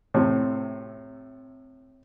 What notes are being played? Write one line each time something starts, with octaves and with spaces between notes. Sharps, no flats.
A2 C3